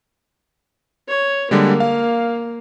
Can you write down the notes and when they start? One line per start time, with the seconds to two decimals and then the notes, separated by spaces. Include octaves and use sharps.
1.08 C#5
1.51 D3 G3 G#3 A#3
1.80 F5